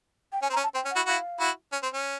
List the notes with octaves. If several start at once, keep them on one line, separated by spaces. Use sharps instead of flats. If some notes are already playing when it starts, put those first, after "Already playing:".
G5
C#4 G#5
C4
A#5
C#4
A5
C4 G5
C#4
F#5
E4 F#4
E4 F#4 F5
E4 F#4
C#4
C4
C#4